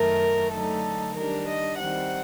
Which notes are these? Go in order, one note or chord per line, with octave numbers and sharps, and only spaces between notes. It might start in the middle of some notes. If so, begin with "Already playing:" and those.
Already playing: F#2 D#3 A3 A#4
D3 F#3 A3 D#4 A4
D#3 G3 D4 A#4
D#5
D#3 G3 C4 F#5